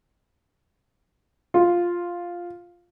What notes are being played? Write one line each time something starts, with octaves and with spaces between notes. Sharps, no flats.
F4